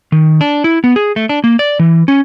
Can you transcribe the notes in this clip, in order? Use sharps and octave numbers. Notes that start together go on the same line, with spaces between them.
D#3
D4
E4
B3
G#4
A3
D4
A#3
D5
E3
C#4